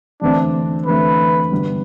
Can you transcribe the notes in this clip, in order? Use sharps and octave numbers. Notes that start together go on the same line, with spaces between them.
E2 D3 A3 C4 D4
E2 D3 A3 C4 B4
G1 G2 D3 G3 B3